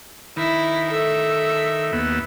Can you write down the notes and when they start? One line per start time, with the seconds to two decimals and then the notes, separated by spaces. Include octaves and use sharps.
0.37 D#3 E4
0.90 A4 E5
1.93 D#2 B3 E6